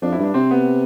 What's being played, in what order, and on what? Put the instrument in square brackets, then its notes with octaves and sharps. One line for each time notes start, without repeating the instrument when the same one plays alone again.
[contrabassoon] F2 [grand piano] D4
[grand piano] E4
[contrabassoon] G2 [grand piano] D4
[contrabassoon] C3 [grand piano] C4
[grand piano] B3